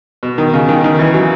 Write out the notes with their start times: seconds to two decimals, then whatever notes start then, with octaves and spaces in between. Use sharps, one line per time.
0.23 B2
0.38 D#3
0.54 C#3
0.69 D#3
0.84 D#3
0.99 E3
1.14 F#3